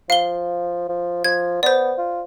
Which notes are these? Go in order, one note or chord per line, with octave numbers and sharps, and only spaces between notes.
F3 F5 G7
F3
F3 G#6
B3 C5 D5
F4